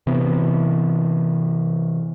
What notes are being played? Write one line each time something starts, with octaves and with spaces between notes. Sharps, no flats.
C3 E3 B3